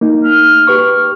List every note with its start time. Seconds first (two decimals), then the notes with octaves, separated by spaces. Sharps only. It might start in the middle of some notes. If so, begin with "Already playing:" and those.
0.01 A#3 D#4
0.23 F6
0.67 G4 B4 C#6